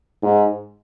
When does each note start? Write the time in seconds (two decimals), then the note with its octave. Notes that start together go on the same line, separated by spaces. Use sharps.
0.22 G#2